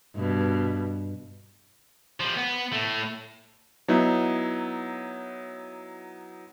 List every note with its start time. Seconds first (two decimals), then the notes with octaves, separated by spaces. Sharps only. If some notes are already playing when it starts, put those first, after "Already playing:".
0.16 G2 B2
2.20 F3 G3
2.37 B3
2.72 A2 A3
3.88 F#3 B3 D#4 E4